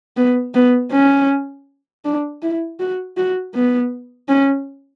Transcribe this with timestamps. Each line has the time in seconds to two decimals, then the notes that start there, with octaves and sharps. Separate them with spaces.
0.17 B3
0.54 B3
0.92 C#4
2.04 D4
2.42 E4
2.80 F#4
3.17 F#4
3.54 B3
4.29 C#4